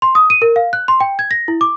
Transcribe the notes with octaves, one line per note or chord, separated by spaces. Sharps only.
C6
D#6
D#7
A#4
F5
F#6
C6
G5
G#6
A#6
E4
D6